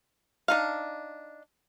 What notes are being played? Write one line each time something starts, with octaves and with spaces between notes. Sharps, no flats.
D4 D#4 F5